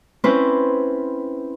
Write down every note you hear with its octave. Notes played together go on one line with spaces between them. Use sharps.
C4 C#4 E4 B4 C5